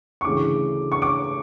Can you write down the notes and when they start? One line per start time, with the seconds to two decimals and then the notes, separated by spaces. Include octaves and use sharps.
0.21 C#6
0.24 D2 C#3 E3 D6
0.92 C#6
1.02 D6